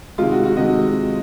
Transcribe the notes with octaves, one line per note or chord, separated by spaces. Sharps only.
C3 D#3 G#3 F4
F#4
F#4
C3 D#3 G#3 D#5